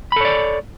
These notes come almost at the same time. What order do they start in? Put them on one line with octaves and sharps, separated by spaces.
B5 A4 C#5 D5